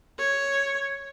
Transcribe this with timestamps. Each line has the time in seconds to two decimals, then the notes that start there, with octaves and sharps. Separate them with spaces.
0.19 C#5